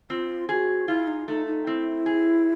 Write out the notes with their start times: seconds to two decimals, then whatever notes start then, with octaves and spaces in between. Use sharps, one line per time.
0.10 C4 F4
0.49 F#4 G#4
0.88 E4 F4
1.07 D#4
1.28 A3 D#4
1.47 D#4
1.67 C4 E4
2.06 G#4